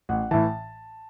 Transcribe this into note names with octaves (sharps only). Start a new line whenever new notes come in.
A1 F#5
A2 E3 A5